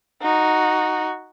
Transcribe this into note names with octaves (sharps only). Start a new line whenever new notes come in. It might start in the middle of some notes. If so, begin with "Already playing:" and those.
D#4 F#4